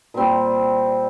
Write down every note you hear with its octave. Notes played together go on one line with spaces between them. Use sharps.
A#2 G3 C4